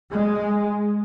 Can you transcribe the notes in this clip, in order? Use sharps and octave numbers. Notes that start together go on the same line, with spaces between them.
G#3